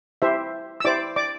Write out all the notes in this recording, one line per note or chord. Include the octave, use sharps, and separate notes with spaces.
E4 G4 C5 E5
E6
E4 G4 C5 D5 D6
D5 D6